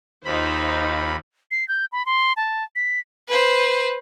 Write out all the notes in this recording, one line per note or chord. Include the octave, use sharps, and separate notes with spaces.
D#2 D#4 F4 C5 B5
C7
G6
B5
C6
A5
B6
B4 C5